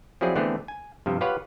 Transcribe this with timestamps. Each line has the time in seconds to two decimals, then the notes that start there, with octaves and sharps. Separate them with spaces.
0.21 F3 F#3 C4 E4 G#4 D5
0.36 D3 E3 A3 B3 C4 G#4
0.68 G#5
1.06 G2 C3 F3
1.21 F4 G4 B4 C#5 F5 F#5